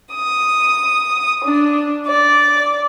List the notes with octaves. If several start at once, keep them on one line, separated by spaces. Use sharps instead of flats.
D#6
D4
D5